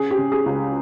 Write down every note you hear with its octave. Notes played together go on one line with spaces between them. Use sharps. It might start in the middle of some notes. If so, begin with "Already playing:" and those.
Already playing: C#3 G#4
G4
C#3
G#4
C#2